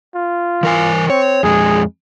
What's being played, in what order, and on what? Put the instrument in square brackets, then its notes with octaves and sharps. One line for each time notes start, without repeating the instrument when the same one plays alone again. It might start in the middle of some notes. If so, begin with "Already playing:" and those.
[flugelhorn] F4
[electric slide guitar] E3 A#4 G#5
[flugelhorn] C4 [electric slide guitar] C#5
[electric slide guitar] F2 G#3 [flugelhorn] G#4